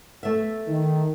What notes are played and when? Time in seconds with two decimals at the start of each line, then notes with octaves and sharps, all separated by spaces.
0.23 A3 E5
0.68 D#3